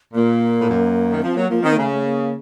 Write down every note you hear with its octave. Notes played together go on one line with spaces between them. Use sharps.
A#2 A#3
A2
F#2
D#3
A#3
F3 C4
F#3 A#3
F3 A#3
D#3 C4
A#3
C#3 A3
A3
A#3